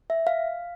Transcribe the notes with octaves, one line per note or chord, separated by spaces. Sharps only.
E5
F5